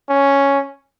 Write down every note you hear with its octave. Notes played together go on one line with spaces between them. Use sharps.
C#4